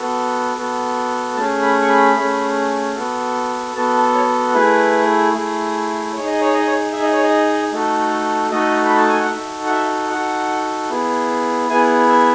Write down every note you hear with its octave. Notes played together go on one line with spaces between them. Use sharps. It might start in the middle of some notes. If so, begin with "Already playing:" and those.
Already playing: B3 F#4 A4
B3 F#4 A4
A3 C#4 G#4 A5
B5
C#6
B5
A3 C#4 G#4
B3 F#4 A4
B3 F#4 A4 A5
A5
C#5
A3 E4 G#4 B4
A3 E4 G#4
D#4 G#4 C#5
D#5
C#5
D#5
C#5
D#4 G#4 E5
D#5
C#5
D#5
A3 D#4 F#4 A4
A3 D#4 F#4 A4 D#5
B5
A5
G#5
F#5
D#4 F#4 A4 E5
F#5
E5
D#4 F#4 A4 F#5
B3 E4 G#4
B3 E4 G#4 G#5
E5